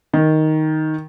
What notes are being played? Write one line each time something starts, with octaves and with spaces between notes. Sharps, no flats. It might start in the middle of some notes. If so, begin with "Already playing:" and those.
D#3